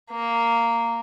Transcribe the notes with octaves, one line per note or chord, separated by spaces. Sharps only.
A#3